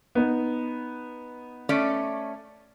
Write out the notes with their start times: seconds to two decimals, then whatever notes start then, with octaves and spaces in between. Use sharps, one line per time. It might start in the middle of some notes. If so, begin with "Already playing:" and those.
0.15 B3 D#4
1.69 A3 C#4 D5